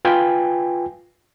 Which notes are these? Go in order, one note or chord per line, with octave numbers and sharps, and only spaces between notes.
F4 B4 G5 G#5